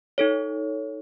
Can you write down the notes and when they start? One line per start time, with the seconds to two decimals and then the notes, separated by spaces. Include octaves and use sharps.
0.18 D#4 A4 C#5